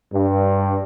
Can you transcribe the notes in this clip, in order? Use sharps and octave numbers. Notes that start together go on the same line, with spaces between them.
G2